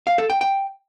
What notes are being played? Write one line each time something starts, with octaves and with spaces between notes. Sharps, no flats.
F5
A4
G5
G5